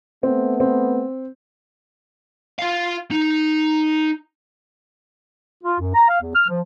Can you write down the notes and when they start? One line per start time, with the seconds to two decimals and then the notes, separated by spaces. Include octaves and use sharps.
0.23 A3 B3 C4
0.60 C4
2.59 F4 F5
3.11 D#4
5.63 F4
5.80 F#2
5.94 A#5
6.09 F5
6.20 E2
6.35 F6
6.48 F3